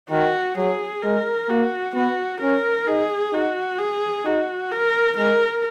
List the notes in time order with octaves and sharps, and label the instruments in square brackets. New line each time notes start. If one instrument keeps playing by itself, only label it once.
[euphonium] D#3 [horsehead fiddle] F#4
[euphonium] F#3 [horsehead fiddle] G#4
[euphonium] G#3 [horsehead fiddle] A#4
[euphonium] A#3 [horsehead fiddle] F#4
[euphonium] B3 [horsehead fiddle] F#4
[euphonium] C#4 [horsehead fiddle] A#4
[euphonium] D#4 [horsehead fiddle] G#4
[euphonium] D#4 [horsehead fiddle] F#4
[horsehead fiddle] G#4
[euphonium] D#4 [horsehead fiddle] F#4
[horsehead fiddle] A#4
[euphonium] G#3 [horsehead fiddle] A#4